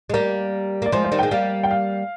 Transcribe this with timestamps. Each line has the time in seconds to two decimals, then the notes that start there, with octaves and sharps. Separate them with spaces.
0.09 G#3
0.13 G3 A#3 A#4
0.82 A#3 D5
0.92 F3 G#3 C5
1.05 C5
1.12 D#3 G3
1.19 G#3 G5
1.31 G3 A#3 F5
1.63 G5
1.71 F5